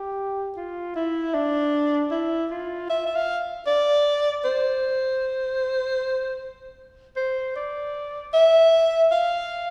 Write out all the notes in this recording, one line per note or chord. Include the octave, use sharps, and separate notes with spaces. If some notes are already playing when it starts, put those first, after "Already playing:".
Already playing: G4
F4
E4
D4
E4
F4
E5
E5
F5
D5
C5
C5
D5
E5
F5